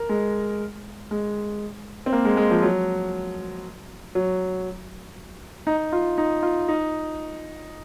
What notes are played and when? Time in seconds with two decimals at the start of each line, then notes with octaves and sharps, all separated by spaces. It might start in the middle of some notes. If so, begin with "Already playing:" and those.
Already playing: A#4
0.09 G#3
1.11 G#3
2.06 C4
2.13 A#3
2.25 G#3
2.37 G#3
2.51 F3
2.63 F#3
4.15 F#3
5.67 D#4
5.92 F4
6.18 D#4
6.43 F4
6.68 D#4